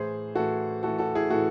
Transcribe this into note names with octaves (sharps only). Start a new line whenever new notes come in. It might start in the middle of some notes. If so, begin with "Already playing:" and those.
Already playing: A2 E3 G#4 C5
A2 E3 F#4 A4
A2 E3 F#4 A4
F#4 A4
E4 G#4
A2 E3 F#4 A4